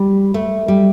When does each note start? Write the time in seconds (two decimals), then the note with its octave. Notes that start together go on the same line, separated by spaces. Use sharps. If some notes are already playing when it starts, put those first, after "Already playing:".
Already playing: G3
0.34 A3
0.68 G3